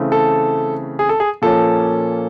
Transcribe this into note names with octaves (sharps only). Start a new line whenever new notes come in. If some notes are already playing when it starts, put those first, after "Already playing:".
Already playing: C#3 E3 A3 C4
A4
G#4
A4
G#4
A#2 F3 A#3 C#4 A4